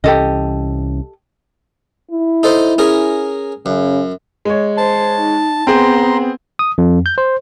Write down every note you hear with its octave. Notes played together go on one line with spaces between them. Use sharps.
C2 E3 C#4 G4 A4 D#5
E4
D#4 A4 C5
C#4 G#4 A#4
F#2 C#3
G#3 C#5
C5 A5
D#4
B3 C4 G#4 A#5 C6
D#6
F2
G6
C5